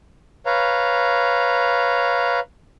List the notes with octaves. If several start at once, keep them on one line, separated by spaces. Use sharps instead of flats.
B4 C#5 F5 A#5